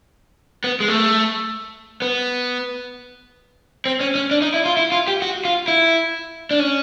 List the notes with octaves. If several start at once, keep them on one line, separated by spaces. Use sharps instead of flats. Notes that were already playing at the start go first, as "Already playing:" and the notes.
B3
G#3
A3
B3
C4
C#4
C#4
D4
D#4
E4
F4
E4
F4
G4
F#4
F4
E4
D4
C#4